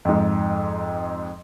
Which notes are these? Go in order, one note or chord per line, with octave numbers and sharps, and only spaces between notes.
F2 G#2